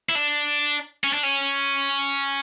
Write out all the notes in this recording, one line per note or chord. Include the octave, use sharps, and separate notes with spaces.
E4
D4
C#4
D4
C#4